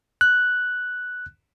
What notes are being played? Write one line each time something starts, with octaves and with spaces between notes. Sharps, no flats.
F#6